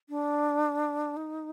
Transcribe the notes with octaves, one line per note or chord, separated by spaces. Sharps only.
D4
D#4